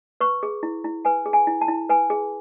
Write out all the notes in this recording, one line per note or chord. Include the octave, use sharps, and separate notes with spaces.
B4 C#6
G#4
E4
E4
B4 G#5
G#4
G#5
E4
A5
E4
B4 G#5
G#4